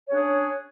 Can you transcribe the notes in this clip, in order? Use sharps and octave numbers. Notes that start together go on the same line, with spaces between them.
C#4 D4 G#4 C#5